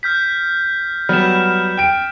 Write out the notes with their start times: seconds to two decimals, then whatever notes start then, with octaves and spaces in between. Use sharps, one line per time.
0.03 F6 G6 B6
1.09 F#3 G3 B3 F6 E7
1.77 G5 D7